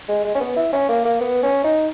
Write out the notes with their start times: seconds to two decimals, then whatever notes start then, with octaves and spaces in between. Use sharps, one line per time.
0.09 G#3
0.25 G#3
0.35 C#4
0.41 B3
0.57 E4
0.73 C#4
0.89 A#3
1.06 A#3
1.21 B3
1.43 C#4
1.64 D#4